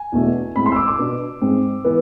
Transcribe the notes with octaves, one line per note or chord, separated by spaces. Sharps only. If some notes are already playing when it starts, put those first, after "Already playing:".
Already playing: G#5
E2 B2 A3 D4
A2 G#3 C4 B5
C6
E6
D6
D6
B2 B3 D4
G#2 G#3 C4
E3 B3